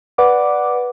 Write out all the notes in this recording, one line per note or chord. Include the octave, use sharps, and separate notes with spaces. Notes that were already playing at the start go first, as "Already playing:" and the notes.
B4 D5 F#5 D6